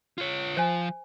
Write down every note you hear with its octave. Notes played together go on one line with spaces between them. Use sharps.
F4 C#5
F3 C5 G#5